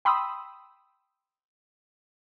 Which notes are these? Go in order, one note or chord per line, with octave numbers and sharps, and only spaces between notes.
G5 B5 C6 D#6 E6